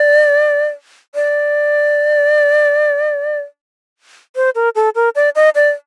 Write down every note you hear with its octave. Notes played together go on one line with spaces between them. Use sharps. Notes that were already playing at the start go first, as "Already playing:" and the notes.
Already playing: D5
D5
C5
A#4
A4
A#4
D5
D#5
D5